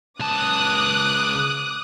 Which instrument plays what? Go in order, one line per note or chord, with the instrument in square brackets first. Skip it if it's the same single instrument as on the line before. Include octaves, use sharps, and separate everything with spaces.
[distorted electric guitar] C#2 A5 [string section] D6 D#6 F#6